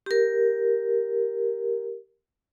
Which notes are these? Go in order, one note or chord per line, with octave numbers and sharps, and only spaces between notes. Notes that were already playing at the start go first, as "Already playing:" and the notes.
G4 A#4